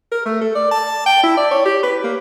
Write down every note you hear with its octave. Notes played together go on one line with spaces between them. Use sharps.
A#4
A3
A4
D5
A5
G5
E4
D5
C#5
G4
B4
A#3